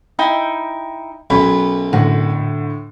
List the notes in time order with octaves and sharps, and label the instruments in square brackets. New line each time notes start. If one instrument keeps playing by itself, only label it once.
[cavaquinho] D#4 E4 G5
[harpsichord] B1 F#2 [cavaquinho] B5
[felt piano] A2 D3 [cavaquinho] F#4